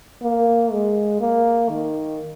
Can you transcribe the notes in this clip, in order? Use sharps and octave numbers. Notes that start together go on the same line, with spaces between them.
A#3
G#3
A#3
D#3